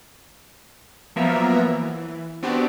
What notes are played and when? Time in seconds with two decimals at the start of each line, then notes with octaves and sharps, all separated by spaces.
1.16 F3 F#3 A#3 B3 A#4 E5
1.65 E3
2.42 B3 C4 D4 F#4 G4 D5